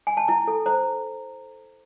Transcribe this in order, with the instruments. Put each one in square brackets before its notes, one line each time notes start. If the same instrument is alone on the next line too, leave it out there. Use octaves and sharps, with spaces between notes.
[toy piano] G#5
A5
E4 A#5
A4
C5 A#5